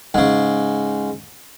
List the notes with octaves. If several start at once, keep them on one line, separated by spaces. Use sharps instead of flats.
G#2 C#3